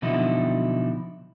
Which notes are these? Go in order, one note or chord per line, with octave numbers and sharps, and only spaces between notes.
B2 D3 F3 F#3 D#4 E4